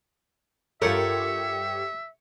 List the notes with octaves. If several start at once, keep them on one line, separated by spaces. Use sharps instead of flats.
G2 F4 G4 A4 A#4 C#5 E5 F#5